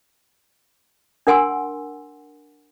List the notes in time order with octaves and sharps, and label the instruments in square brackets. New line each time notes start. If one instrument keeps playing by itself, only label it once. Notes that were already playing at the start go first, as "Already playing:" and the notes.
[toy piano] D4 A#4 F#5 G#5 C6 E6